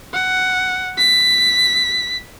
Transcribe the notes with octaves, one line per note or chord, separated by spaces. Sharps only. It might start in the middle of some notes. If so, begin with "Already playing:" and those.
F#5
B6